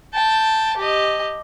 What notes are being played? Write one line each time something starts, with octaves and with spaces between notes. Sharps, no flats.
G5 A5
G4 D#5